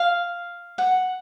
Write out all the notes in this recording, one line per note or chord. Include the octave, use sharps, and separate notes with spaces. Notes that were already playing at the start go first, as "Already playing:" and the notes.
Already playing: F5
F#5